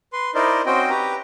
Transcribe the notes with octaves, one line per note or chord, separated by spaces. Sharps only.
B4 C6
D#4 E4 A#4 C5 D5 D#5
C4 C#4 F#4 C5 D#5 G5
G4 B4 A#5